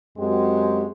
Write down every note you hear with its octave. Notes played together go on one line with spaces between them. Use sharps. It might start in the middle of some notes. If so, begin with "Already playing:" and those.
F#2 G#3 C4 F#4 G4